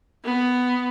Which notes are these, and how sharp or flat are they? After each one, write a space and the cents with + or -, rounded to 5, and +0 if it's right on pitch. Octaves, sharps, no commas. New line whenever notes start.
B3 +10